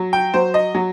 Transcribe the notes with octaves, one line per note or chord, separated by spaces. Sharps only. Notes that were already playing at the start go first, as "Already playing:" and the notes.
Already playing: F#3
G5
F#3 C5
D#5
F#3